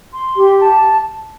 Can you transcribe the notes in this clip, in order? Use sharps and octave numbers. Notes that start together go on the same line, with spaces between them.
C6
G4
A5